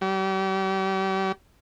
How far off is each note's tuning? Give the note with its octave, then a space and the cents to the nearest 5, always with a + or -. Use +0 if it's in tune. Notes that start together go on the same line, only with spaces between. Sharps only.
G3 -40